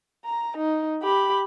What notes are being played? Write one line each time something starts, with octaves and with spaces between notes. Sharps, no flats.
A#5
D#4
G4 B5